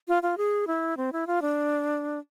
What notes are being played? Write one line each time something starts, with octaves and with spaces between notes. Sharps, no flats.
F4
F4
G#4
E4
C4
E4
F4
D4